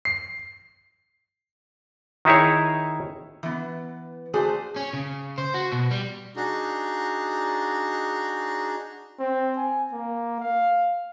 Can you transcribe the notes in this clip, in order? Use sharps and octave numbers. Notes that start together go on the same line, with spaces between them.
C7
D#3 D#4 E4 G#4 C#5
E3 B3
A3 F#4 G#4 C5 D5
C#4
C#3
C5
F#4
B2
G3
D4 D#4 F#4 G#4
C4
G#5
A#3
F5